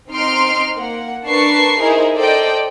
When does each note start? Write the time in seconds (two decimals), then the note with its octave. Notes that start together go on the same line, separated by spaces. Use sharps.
0.10 C4 D#4 C6 F6 C7 D7
0.76 A#3 F#5
1.27 D4 A#4 B4 A5 C#6 C7
1.80 D#4 E4 G#4 A#4 C5
2.15 A4 C5 D5 D#5 G5